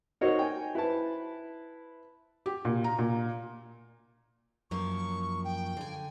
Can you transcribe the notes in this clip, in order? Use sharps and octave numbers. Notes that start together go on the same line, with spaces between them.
D#4 F#4 A#4 C5 C#5 D#5
G5 G#5
E4 B4 C5 A5
G4
A#2
A#5
A#2
F#2 F3 A#3 C#6
G5
D3 G#5